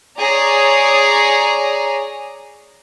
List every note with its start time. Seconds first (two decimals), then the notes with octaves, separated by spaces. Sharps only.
0.19 G#4 C#5 D5 A#5